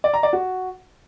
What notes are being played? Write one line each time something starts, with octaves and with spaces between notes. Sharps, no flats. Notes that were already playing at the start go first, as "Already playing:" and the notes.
D5
A#5
D5
F#4